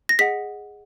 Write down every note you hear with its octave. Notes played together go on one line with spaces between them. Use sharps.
A#6
G#4 D#5 F#5 B6